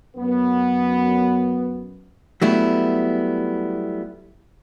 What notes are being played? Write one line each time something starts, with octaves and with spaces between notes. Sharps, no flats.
F#2 B3
F#3 G3 A3 B3 E4